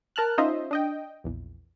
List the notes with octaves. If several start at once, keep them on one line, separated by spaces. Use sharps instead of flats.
A#4 A5 F6 F#6
C#4 D#4 F4 C5 D#5 E5
D4 D#5 G5
A#1 E2